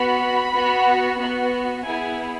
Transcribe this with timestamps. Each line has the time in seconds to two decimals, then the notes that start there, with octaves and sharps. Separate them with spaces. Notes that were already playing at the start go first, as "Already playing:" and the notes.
Already playing: B3 F#4 B5
0.54 B3 F#4
1.19 B3 F#4
1.85 B3 E4 G#4 G#5